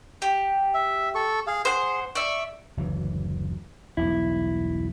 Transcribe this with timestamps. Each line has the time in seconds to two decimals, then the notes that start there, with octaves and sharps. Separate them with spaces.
0.22 G4
0.74 E5
1.15 A4 C#6
1.47 G#4 F5
1.65 G#4 C5 F#5
2.15 D5 E5 C#6
2.77 F#1 D2 E3
3.97 E1 B1 G2 E4